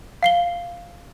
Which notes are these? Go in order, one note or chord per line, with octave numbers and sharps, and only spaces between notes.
F5 C7 G7